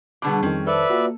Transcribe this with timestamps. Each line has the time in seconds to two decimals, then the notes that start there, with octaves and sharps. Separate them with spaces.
0.22 B2 D3 G3 B3 G#4 C#6 D6
0.43 F2 D#3 C4 C#4
0.67 A4 B4 C5 D5 E5
0.90 A#3 F4 F#4